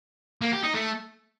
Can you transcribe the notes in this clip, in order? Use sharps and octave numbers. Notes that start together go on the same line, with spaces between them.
A#3
G4
D#4
A3